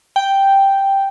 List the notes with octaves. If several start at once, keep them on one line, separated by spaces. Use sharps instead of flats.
G5